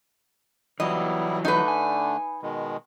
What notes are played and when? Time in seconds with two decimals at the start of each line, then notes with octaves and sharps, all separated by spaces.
0.80 E3 F#3 G3 B3 E4 D#5
1.45 D3 A3 D4 D#4 B4
1.68 G#5
2.43 B2 D#3 G#3